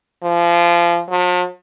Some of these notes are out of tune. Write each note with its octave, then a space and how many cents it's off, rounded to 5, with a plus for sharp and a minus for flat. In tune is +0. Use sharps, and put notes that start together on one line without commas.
F3 -25
F3 +45